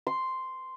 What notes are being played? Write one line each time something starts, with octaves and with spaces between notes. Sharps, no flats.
C6